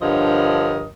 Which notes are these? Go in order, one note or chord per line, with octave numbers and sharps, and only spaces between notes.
G2 D3 F3 A#4 C#5 D#5